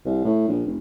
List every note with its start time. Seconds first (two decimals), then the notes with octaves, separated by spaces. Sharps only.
0.05 C2
0.24 A2
0.48 A#1
0.67 F1